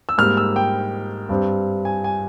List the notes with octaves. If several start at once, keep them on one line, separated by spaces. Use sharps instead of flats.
E6
G#2 G3 A#3 F6
E6
G5
G2 G3 C4
G#5
G#5